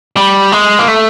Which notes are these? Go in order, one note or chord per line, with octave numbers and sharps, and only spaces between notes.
G3
G#3
A#3
A3